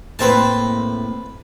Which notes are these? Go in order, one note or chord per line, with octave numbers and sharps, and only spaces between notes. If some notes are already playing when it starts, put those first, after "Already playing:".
A2 A#3 C4 B4 C5 A5